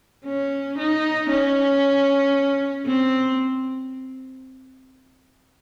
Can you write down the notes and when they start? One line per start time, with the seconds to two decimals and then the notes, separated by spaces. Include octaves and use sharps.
0.25 C#4
0.78 D#4
1.29 C#4
2.86 C4